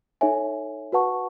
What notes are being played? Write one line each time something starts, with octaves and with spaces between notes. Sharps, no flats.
D#4 A4 C#5 E5 G#5
F#4 B4 F#5 A5 C#6